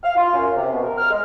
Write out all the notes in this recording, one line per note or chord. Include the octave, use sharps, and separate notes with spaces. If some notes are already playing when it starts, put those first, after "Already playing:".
F5
F4
F#2
C3
B2
A#4
F6
G#3